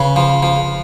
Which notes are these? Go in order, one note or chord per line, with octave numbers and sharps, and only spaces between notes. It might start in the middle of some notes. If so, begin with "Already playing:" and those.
Already playing: C#3 B4
F3
F3